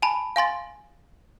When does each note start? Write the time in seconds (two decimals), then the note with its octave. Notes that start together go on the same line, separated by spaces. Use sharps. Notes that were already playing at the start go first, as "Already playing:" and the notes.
0.02 G#5 A5 B5
0.36 F5 G#5 C6 A6